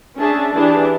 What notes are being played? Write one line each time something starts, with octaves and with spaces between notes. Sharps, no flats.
C#4 D4 G#4 E5 A5
E3 D4 G4 G#4 A5